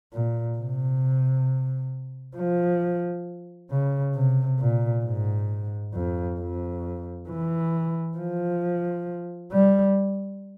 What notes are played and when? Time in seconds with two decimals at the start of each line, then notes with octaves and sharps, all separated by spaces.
0.13 A#2
0.58 C3
2.37 F3
3.71 C#3
4.15 C3
4.59 A#2
5.05 G#2
5.94 F2
6.39 F2
7.29 E3
8.17 F3
9.52 G3